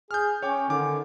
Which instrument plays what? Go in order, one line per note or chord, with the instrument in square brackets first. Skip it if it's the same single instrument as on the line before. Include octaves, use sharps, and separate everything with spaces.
[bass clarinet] G#4 [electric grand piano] F6 G6
[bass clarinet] C#4 [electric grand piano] C#5 G5 D6
[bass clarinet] D3 [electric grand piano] D#3 G#5 D6